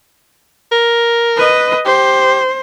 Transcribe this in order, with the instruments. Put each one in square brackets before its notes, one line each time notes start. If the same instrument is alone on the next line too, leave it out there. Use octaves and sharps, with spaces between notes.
[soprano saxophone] A#4
[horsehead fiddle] B4 D#5
[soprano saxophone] G4 [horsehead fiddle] C5